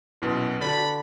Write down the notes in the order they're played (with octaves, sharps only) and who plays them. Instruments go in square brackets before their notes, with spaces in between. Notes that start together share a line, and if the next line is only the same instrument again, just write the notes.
[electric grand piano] A#1 F#2 B2 [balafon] E4 B4
[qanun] D3 D4 F#4 [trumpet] B5 [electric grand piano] A6